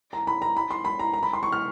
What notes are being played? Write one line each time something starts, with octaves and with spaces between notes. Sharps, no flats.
A#5
B5
A#5
B5
C6
B5
A#5
A#5
B5
C6
C#6
F6